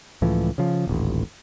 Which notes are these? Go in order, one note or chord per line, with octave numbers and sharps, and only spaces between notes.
C#2 A2 E3 F3
C#3 F3
D#1 A1